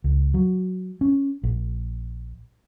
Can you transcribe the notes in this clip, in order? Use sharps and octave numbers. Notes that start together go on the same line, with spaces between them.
C#2
F#3
C#4
A#1